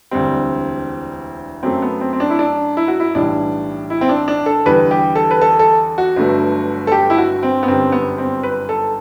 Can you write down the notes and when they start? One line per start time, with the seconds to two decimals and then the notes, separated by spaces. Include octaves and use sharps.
0.11 E1 D2 D3 G3 C4
1.63 F#2 F#3 A3 C4
1.82 B3
2.01 C4
2.13 C4
2.20 D4
2.30 E4
2.39 D4
2.77 E4
2.88 F#4
3.00 E4
3.15 B1 A2 E3 G3 D4
3.90 E4
4.01 C4
4.09 D4
4.28 D4
4.46 A4
4.65 E2 D3 G3 B4
4.91 G4
5.16 A4
5.31 B4
5.41 A4
5.59 A4
5.98 F#4
6.16 G1 G2 F#3 A3
6.87 A4
6.92 G4
7.10 E4
7.18 F#4
7.43 C4
7.63 B3
7.68 G1 F#2 D3 G3 C4
7.92 B3
8.18 C4
8.43 B4
8.69 A4